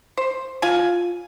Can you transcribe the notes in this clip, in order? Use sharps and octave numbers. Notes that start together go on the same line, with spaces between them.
C5
F4 G#5